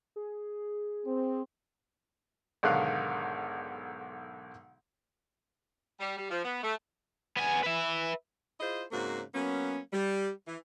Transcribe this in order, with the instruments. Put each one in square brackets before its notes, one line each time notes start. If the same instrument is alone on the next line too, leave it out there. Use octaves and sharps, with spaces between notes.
[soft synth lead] G#4
[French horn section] C4
[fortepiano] B1 G#2 D3 D#3 F5 F#6
[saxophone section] G3
G3
F3
B3
A3
[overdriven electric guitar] B3 G#5
B4 E5
[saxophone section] E4 F4 G#4 C5 D#5
G#2 C#3 A#3 C4 F#4
F#3 A#3 B3 C#4
G3
E3